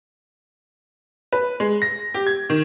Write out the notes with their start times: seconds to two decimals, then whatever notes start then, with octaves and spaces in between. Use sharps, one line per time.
1.32 B4
1.60 G#3
1.82 A#6
2.14 G4
2.27 G#6
2.50 D#3